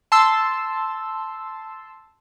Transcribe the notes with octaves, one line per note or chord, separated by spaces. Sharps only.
A5 C6 E6